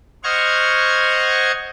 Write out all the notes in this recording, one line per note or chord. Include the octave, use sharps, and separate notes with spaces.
C5 D#5 F#5 C#6 F6 G#6